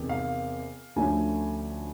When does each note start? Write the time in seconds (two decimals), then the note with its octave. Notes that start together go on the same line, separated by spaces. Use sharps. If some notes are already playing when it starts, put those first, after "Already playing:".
Already playing: E2 C3 D#3
0.09 F5
0.96 D2 D3 F3 A3 C#4 G#5